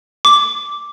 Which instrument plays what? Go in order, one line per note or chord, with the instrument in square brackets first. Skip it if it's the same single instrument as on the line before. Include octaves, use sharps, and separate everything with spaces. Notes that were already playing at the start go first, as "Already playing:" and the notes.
[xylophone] D6